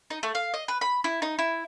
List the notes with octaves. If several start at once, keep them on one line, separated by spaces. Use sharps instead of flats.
D#4
A3
F5
D#5
B4
B5
E4
D#4
E4